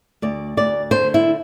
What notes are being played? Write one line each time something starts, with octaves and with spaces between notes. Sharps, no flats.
D2 D5
D2 D5
D3 C5
E4